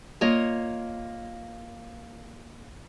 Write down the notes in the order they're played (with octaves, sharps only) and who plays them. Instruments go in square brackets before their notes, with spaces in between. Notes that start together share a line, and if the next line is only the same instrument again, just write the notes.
[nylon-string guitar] A#3 F4 C#5 D#5